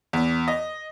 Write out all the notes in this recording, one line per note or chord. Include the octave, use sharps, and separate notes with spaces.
E2
D#5